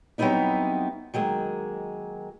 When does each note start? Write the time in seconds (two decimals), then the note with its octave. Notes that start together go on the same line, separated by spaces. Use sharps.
0.18 F#3 G3 B3 C4 D#4 E4
1.14 D#3 F#3 G#3 A#3